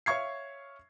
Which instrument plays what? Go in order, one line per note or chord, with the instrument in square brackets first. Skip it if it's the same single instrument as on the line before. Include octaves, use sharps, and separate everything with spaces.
[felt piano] C#5 E5 F5 C#6 G#6 C7